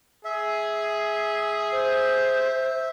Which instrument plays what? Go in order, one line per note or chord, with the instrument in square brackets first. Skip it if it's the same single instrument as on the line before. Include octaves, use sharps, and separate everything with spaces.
[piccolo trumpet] G#4 [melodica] E5
[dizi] C5